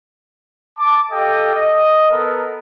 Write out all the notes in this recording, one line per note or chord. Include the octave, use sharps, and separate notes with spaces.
A5 D6
G4 A4 D#5 F5 G5
D#5
B3 A4 A#4